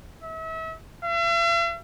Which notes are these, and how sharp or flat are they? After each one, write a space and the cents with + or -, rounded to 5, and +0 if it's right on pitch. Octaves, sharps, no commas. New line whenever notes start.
E5 -35
E5 +45